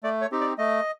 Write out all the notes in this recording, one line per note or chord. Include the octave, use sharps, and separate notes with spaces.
A3 D5
C#5
C4 D#4 G4
D5
A3 D#5